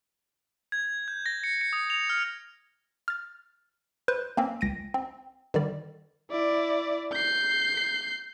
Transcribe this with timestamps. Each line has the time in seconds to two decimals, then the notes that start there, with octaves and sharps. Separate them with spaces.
0.72 G#6
1.08 G6
1.26 A#6
1.44 C#7
1.61 C#7
1.73 D#6
1.90 F7
2.10 F6
3.08 F6 A6
4.08 B4 C5 G6
4.37 A#3 C4 C#4
4.61 C#2 A#6 D7 D#7
4.94 C4
5.54 D3 D#3 G3 D5
6.31 E4 D5
7.13 G6 C7